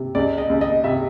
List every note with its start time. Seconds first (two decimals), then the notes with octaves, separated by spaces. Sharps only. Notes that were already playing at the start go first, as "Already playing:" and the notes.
Already playing: C3
0.15 C#2 D5
0.38 D#5
0.50 C#2
0.61 D#5
0.84 C3 E5